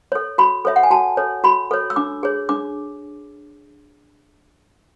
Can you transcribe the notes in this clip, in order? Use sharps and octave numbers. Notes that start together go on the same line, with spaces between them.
A4 C#5
F#4 B5
A4 C#5 E5
F#5
G#5
F#4 A5
A4 C#5
F#4 B5
A4 C#5
E6
D4 D6
G#4 C#5
D4 D6